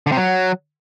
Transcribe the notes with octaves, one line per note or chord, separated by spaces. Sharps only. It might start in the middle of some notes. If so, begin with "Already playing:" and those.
D3
C3
F#3